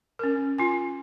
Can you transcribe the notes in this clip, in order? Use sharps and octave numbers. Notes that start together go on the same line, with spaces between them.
C#4 A#4
F4 G#5